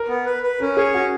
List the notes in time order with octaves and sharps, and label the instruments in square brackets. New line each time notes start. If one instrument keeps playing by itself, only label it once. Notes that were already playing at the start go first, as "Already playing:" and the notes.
Already playing: [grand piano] A#4
[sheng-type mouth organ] B3
B4
B4
[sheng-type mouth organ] C#4 [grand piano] A#4
[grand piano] G#4 [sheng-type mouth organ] C#5
[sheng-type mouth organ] C#4 [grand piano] F#4